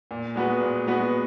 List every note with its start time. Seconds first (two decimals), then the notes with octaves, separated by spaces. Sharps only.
0.11 A#2
0.36 G#3 B3 F#4 B4
0.61 A#2
0.87 G#3 B3 F#4 B4